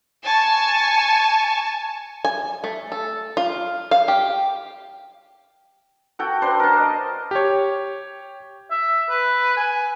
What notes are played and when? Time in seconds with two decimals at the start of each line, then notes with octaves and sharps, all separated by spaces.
0.24 G#5 A5 C#6
2.25 G#5
2.64 A3
2.92 A4
3.37 F4
3.91 F5
4.08 G4
6.19 F#4 A4 G5
6.42 D4 B4 C5 C6
6.60 A#4 A5
6.78 D#5
7.31 G4 C#5
8.71 E5
9.09 B4
9.57 G#5